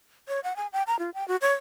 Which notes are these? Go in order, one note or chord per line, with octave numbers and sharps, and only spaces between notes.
C#5
F#5
G#5
G5
A#5
F4
G5
F#4
C#5